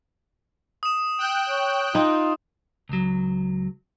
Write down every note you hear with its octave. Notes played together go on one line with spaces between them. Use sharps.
D#6 E7
G5 F#6
C#5
D#4 F4
C#2 F#3